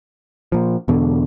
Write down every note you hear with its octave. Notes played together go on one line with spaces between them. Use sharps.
A#2 F3
E2 B2 D3